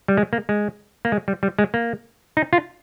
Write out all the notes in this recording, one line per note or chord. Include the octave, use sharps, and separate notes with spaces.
G3
G#3
A#3
G#3
A#3
G#3
G3
G3
G#3
A#3
D#4
F4